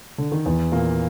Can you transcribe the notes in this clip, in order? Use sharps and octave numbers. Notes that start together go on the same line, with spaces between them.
D3
D#3
E2 E3
A#2 A#3